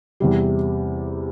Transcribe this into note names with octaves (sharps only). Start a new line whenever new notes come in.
E2 C3 G3